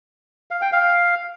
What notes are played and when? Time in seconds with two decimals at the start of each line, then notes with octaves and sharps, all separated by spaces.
0.51 F5
0.62 G5
0.73 F5